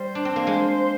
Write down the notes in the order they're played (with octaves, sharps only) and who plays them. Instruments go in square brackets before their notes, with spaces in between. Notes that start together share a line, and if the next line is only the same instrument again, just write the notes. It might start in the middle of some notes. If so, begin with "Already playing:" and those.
Already playing: [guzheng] G3 [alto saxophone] C5
[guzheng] D4
C4
A#3
G#3